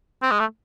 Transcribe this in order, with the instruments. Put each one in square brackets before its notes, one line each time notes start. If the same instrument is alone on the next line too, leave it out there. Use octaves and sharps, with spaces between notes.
[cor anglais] C4
G#3
A3